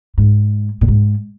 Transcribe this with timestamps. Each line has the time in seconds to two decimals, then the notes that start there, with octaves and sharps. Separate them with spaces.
0.18 G#2
0.81 A#2
0.88 G#2